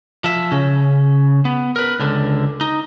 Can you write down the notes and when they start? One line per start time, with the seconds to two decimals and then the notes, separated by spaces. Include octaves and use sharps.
0.24 F3 E5
0.52 C#3 C#4
1.45 B3
1.76 A#4 B4
1.99 C#2 D3
2.61 D#4